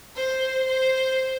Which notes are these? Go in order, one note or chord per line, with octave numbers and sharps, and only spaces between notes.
C5
C5